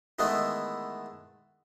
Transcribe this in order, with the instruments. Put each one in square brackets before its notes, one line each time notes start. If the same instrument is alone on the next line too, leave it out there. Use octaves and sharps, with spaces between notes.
[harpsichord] D#3 E3 G#3 A3 B3